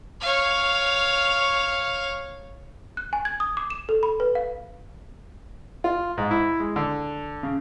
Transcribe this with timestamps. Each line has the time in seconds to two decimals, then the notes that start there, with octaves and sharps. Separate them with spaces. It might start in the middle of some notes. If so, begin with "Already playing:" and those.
0.22 C#5 F5
2.97 F#6
3.13 G#5
3.25 G#6
3.40 D#6
3.57 D6
3.70 E7
3.89 A4
4.03 B5
4.20 B4
4.35 F5
5.84 F4
6.18 G#2
6.31 E4
6.60 G#3
6.76 D3
7.43 C#3